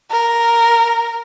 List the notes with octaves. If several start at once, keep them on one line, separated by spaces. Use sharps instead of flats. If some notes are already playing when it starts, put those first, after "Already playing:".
A#4